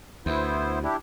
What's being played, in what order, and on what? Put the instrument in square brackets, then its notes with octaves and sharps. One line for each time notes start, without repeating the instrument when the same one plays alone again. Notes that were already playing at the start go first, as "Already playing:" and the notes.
[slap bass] D2 [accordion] B3 E4 C5
[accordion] D4 E4 G4